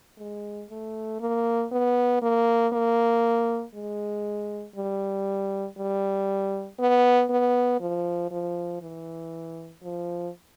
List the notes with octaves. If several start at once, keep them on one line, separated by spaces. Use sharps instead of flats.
G#3
A3
A#3
B3
A#3
A#3
G#3
G3
G3
B3
B3
F3
F3
E3
F3